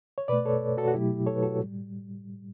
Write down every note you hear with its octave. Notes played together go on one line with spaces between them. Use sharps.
C#5
B2 A3 B4 D5
A4 C#5
F#4 A4
F#4
B2 F#3 A3 E4 G4
A4 C#5
B4
F#4 A4
A2 G3